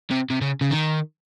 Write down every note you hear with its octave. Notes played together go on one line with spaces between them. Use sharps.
C3
C3
C#3
C#3
D#3